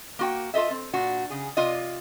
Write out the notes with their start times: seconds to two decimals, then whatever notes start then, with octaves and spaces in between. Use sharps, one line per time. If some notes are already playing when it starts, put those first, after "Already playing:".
0.19 A#3 F#4 G5
0.54 F4 A4 D#5 E5
0.70 C4
0.93 A#2 D4 F#4
1.30 C#3 G#4
1.57 C3 F4 D5 D#5